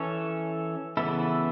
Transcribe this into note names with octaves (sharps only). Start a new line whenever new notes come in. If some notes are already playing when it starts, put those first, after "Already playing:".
Already playing: E3 C#4 A4 C#5
C#3 E3 B3 E4 A4